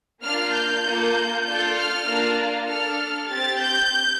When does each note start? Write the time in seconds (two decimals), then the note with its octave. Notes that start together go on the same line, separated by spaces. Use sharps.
0.23 A#3 D4 F4 F6
0.54 G6
0.85 A#3 F4 A4
1.46 D4 F4 A4 G6
1.76 F6
2.07 A#3 D4 F4
2.68 D4 A4 F6
3.29 C4 G4 A6
3.60 G6